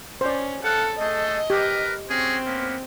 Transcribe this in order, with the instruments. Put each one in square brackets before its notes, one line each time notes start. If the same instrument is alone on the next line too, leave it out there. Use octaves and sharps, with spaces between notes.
[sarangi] C#4 [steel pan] C5 D5
[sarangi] A4 [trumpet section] F5 F#5
[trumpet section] A3 G#4 A4 [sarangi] D#5
[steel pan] G4 [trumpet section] A#4 B4
[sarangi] C4 [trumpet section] C#4 F#4 G#4
[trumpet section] A#3 B3 C#4